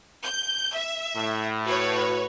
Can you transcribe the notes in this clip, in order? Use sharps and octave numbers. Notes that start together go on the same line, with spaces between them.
G6
E5
A2
F#4 B4 C#5